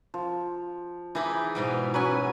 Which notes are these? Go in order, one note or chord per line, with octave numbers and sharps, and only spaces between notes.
F3
E3 D#4 G#4 E5 B5 D6
G#2 B2 G3
F#3 C#4 B4 F#5 G#5